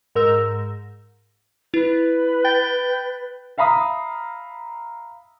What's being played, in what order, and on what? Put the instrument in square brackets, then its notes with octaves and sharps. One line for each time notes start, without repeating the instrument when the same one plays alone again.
[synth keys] G#2 A#4 E6
[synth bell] E4 [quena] B4
[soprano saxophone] G5 [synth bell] A6
[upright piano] E5 F5 A#5 B5 D#6